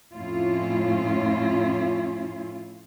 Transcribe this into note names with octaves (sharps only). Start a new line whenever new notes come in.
F2 A2 C#4 E4 F4